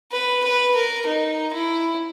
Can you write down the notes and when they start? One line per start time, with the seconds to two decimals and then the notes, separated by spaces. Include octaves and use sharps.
0.12 B4
0.44 B4
0.75 A#4
1.07 D#4
1.53 E4